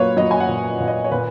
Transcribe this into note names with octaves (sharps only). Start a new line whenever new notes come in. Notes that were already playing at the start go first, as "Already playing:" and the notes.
Already playing: A#2 F#3 A#3 B4 C#5
F#3 D#5
G#5
F#5
A#2
A#2
D#5
C#5
A#2 B4